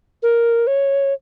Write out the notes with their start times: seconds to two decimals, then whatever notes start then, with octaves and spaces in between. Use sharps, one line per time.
0.23 A#4
0.67 C#5